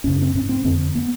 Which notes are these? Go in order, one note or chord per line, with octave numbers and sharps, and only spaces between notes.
F#2 C#3 C#4
C4
G#2 C#4
C4
F2 D3 C4
B3